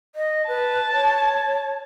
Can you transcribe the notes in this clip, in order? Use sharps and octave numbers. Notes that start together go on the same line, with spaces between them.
D#5
B4 A5
C#5